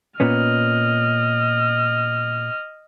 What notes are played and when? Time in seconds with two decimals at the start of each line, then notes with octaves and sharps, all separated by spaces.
0.20 A#2 B3 C#4 D#5 F6